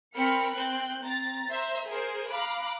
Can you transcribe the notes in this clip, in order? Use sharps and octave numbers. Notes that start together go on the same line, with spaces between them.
C4 A#4 B5 F6 B6 C#7
C4 F#6 G6
C4 A#5 A6
C5 E5 A#5
G#4 A#4 C5
F5 A#5 B5 D6 F#6